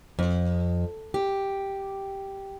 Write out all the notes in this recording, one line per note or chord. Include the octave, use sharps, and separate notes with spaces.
F2
G4